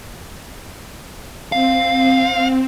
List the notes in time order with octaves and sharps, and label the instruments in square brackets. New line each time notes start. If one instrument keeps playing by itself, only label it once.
[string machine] C4 [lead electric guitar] F5